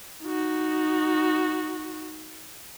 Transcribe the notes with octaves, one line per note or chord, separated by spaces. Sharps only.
D#4 F#4